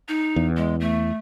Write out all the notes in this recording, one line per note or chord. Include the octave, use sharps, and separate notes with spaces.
D#4
E2
G#3
A3